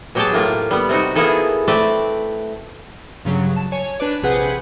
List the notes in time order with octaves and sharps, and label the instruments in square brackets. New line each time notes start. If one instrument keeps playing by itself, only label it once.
[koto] B2 F#3 G4 G#4 G5 A5
A2 A#3 F4
G3 B3
C3 C4 D#4 F#4
A#3 B3 E4 G#4 A4
A3 C4 B4 D5
[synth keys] G2 C#3 F#3
A5
C#5 G#5
D4 B4 D5
A#1 C3 G#4 B4 F#5 G6